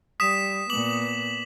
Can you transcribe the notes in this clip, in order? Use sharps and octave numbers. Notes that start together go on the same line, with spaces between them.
G3 D#6 B6 E7
A#2 B3 D6 F#7